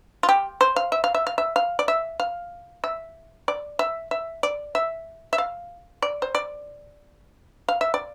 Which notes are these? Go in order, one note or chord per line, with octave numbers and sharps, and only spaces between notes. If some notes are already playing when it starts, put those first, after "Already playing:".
F4
G4
C5
F5
E5
F5
E5
F5
E5
F5
D5
E5
F5
E5
D5
E5
E5
D5
E5
E5
F5
D5
C5
D5
F5
E5
D5